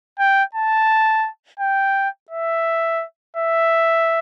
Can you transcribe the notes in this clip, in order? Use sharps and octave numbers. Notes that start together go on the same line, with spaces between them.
G5
A5
G5
E5
E5